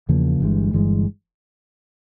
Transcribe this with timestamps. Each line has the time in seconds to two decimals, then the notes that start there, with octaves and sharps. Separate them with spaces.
0.09 E2 C#3 F3 A#3
0.40 G1 G2 E3 G#3
0.73 G1 G2 E3 G#3